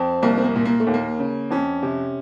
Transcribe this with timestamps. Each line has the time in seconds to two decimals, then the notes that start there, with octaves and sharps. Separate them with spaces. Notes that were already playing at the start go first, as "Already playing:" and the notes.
Already playing: F2 C4
0.23 C2 A#3
0.38 C4
0.44 A#3
0.56 A#2
0.65 A#3
0.80 A3
0.87 D#2
0.94 A#3
1.19 C#3
1.51 F2 C#4
1.83 C3